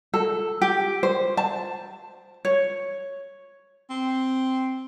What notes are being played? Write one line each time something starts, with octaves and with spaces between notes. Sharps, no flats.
A4
G4
C5
A5
C#5
C4